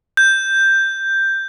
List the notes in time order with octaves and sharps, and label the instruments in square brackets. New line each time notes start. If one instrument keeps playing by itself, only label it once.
[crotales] G6